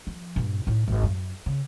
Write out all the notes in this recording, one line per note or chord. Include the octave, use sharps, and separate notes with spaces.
F3
G2 A#2
A2 D#4
G#1 F#2
F#2
C#3